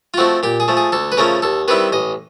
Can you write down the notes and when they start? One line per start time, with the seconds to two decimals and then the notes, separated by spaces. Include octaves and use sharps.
0.14 F4
0.17 F3 A3 C4 F#4
0.43 A#2 G4
0.60 G#4
0.68 F3 A3
0.77 G#4
0.92 D2 A4
1.12 B4
1.17 C#3 F3 A3 C#4 A#4
1.42 D#2 A4
1.68 D#3 G3 C4 E4 B4
1.92 A1 D#5